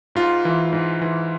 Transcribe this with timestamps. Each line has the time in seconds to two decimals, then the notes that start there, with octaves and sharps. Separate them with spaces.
0.15 G#2 F4
0.45 E3
0.73 G#2
1.02 E3